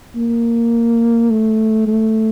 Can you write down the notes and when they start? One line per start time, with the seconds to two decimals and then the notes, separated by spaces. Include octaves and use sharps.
0.16 A#3
1.30 A3
1.87 A3